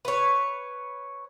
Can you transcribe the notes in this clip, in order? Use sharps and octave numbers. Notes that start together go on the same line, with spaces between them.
B4 C#5